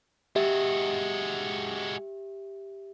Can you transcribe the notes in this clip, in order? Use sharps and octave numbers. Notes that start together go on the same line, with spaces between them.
G#3 F#4 G4 E5